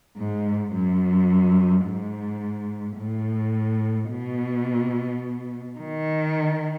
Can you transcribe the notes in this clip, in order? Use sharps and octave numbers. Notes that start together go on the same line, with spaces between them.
G#2
F#2
G#2
A2
B2
D#3